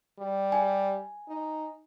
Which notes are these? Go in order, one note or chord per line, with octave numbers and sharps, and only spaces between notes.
G3
G#5
D#4